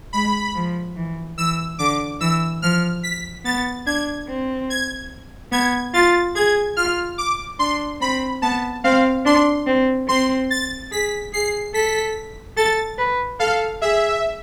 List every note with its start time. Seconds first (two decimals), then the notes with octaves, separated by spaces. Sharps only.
0.13 G#3 B5
0.55 F3
0.96 E3
1.38 E3 E6
1.79 D3 D6
2.21 E3 E6
2.62 F3 F6
3.03 B6
3.45 B3 A6
3.86 D4 G#6
4.28 C4
4.70 G#6
5.52 B3 G#6
5.94 F4 A6
6.35 G#4 G#6
6.77 F4 F6
7.18 D6
7.59 D4 C6
8.01 C4 B5
8.42 B3 A5
8.84 C4 F5
9.26 D4 C6
9.67 C4
10.08 C4 C6
10.50 A6
10.92 G#4 B6
11.33 G#4 C7
11.74 A4 B6
12.57 A4 A6
12.98 B4
13.40 A4 F5
13.82 G#4 E5